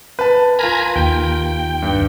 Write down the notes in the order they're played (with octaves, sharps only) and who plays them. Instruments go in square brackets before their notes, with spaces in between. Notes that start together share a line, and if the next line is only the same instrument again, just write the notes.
[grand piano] B4 A5
[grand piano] F4 A#4 [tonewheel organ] G#5 A#5 B5
[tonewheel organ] D#2 G5
[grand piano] G2